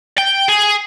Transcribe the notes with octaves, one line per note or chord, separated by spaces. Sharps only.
G5
G#4